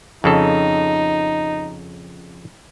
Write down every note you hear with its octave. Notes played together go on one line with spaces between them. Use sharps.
F2 C#3 D#4 A4